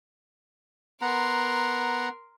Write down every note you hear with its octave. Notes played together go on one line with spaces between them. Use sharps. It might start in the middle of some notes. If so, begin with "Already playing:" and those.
B3 A#4 F#5 A#5 C6